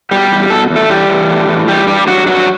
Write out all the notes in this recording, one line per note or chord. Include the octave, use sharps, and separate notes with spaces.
B2 G3 G4
E2
B2 A4
E2
A3 A4
E3 G3 G4
E3
A2
E3
E3 G3 G4
G2 G3 G4
G2 F#3 F#4
G2 F#3 F#4